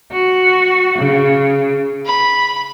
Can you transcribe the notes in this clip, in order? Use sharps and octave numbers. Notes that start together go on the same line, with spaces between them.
F#4
C#3
B5